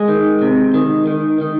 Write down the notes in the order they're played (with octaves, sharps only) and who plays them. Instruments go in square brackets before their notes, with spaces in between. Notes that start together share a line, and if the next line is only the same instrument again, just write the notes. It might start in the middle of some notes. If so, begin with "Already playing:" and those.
Already playing: [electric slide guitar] G#3
D#3
C3
D#3
D#3
D#3